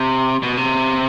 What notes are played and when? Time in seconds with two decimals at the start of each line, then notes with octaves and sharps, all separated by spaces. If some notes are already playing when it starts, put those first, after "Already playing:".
Already playing: C3
0.43 B2
0.57 C3